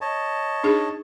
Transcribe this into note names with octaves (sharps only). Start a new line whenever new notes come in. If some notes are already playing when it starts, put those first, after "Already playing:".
C#5 D#5 A5
D4 D#4 G#4